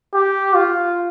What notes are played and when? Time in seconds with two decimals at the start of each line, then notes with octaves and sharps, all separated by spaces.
0.14 G4
0.54 F4